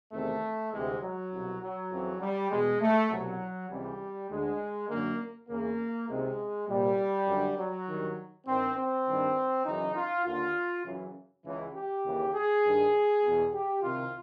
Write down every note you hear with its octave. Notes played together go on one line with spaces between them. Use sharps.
E2 C3 D#3 A3
D2 C3 E3 G#3
F#3
C2 B2
F#3
F2 C#3 E3
G3
E2 B2 G#3
A3
C2 B2 F#3
C#2 C3 E3 G3
D2 D3 G#3
F#2 D3 A#3
E2 C#3 E3 A#3
C#2 C3 D#3 G#3
C2 A#2 G3
F#2 D3
F#3
G2 D#3
G2 D#3 C4
C4
G2 D#3
F#2 C#3 E3 D#4
F4
D#2 D3 F4
F#2 C#3 E3
C#2 C#3 E3
G4
D#2 C#3 E3
G#4
G2 D#3
E2 B2
G4
C2 C3 D#3 F4